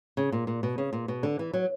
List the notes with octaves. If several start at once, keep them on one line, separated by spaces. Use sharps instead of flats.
C#3
A#2
A#2
B2
C#3
A#2
B2
D3
E3
F#3